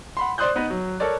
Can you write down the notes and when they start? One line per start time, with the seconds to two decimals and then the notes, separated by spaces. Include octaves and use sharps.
0.17 F#5 B5 C6
0.38 C5 D5 C6 D#6 F#6 G6
0.56 B3 D#4 B4
0.70 F#3
1.00 A4 A#4 C#5 D5